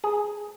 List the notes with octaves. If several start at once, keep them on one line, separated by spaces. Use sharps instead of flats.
G#4